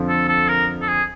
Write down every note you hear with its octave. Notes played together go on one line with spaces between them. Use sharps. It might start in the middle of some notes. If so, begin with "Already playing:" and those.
Already playing: F2 D3 F3
A4
A4
A#4
A4
G#4